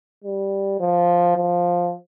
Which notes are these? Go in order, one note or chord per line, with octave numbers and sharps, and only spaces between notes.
G3
F3
F3